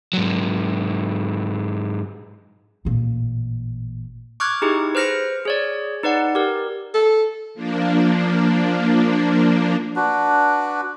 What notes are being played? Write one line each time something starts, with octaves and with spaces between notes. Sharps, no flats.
G#2 F#3
A1 A#2
C#6 D6 F6 F#6 G#6
D#4 E4 G4 G#4
B4 C5 F6 A#6 C#7
G#4 C#5 D5
D#4 B4 D5 F#5
G4 A#4
A4
F3 A#3 D4
D4 F#4 B4